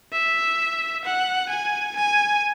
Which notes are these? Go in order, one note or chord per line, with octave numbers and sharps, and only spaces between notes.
E5
F#5
G#5
G#5